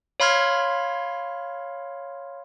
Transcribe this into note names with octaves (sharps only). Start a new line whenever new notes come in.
C#5 F5 B5 C6 F6 G#6